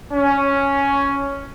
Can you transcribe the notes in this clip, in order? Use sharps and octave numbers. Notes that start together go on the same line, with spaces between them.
C#4